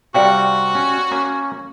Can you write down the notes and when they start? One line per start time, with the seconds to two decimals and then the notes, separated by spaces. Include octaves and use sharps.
0.14 C3 G3 F#4 A#4 D5 F5 G5
0.75 C#4
1.11 A#3 C#4